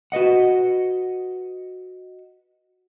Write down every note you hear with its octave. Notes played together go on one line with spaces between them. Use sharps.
F#4 B4 D#5 F#5